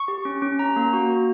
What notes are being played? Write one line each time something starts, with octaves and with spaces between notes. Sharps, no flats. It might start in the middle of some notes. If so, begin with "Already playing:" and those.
Already playing: C#6
G4
C#4
C#4
C#4 A#5
A#3
F#4
A#3